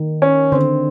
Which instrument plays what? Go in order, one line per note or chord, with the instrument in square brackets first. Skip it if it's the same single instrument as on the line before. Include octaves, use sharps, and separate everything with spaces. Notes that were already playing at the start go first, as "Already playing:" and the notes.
Already playing: [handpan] D#3
[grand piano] C#4
[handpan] D3 [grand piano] C4